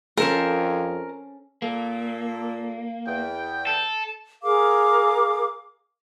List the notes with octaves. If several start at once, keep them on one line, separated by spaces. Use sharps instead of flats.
F2 C#4 A4 A#4 C5
A#2 A#3 A4
E2 G5
A4
G#4 A#4 F5 D6